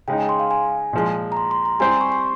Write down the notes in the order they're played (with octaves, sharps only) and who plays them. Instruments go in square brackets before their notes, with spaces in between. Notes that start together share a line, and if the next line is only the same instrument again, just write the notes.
[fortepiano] C#3 G#3 D#4 [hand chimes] G5
[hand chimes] G#5
C6
F5
G#5
[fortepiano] A#2 F3 G#3
[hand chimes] A#5
C6
C6
A#5
[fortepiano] G3 C4 G4 C5 [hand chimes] G#5
[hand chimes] C6
C#6
C6